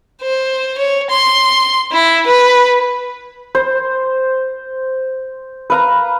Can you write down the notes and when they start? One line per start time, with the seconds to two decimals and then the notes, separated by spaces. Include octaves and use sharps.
0.22 C5
0.79 C#5
1.11 C6
1.92 E4
2.27 B4
3.55 C5
5.70 B4 F5 A#5